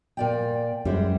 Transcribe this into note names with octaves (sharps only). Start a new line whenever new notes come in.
A#2 D5 G5
F#2 G3 G#3 C5